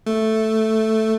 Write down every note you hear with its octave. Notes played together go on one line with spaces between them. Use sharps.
A3